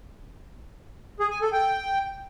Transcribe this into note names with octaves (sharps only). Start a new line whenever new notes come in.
G#4
G#5
A4
G5